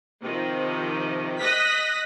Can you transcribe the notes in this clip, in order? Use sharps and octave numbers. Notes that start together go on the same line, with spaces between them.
C3 D#3 F3
D#5 D#6 F#6 A#6 B6